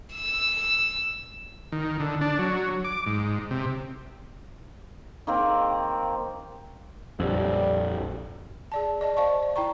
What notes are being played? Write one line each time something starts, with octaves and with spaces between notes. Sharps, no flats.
E6
D#3
D3
D4
F#3
D6
G#2
C3
D#3 A#3 C4
A#1 F2 G3
G#4 D5 A5
D5 D#5 A5
C5 D5 F5 A5 C#6
D5
E4 G5 A#5 C#6